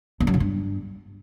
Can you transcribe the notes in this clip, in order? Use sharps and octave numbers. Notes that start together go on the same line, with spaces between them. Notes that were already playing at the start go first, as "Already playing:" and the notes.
E2
F#2
C#3
G2